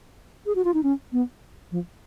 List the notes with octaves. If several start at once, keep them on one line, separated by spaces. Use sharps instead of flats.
G#4
F#4
F4
D#4
C#4
B3
F3